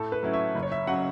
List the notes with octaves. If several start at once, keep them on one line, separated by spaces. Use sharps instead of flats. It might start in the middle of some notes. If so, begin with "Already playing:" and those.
Already playing: A2 A4
B4
F#3 A3 C#4 E4
E5
F#1
C#5
E5
C#3 F#3 F#5